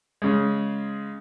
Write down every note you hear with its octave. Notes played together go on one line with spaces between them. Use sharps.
C#3 G#3